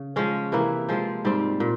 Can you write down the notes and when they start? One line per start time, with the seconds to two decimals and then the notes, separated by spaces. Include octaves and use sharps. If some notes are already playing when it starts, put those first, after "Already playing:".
Already playing: C#3
0.16 F3 G#3 C#4
0.52 C3 E3 A#3 E4
0.89 F3 G#3 C4 F4
1.25 G#2 G3 C4
1.60 A#2